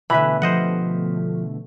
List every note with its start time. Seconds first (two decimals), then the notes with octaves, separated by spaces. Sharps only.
0.10 B2 D3 E3 A3 B4 E5 B5
0.42 F3 G4 C5 D#5 F#5